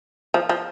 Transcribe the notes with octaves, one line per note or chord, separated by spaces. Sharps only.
F3
F3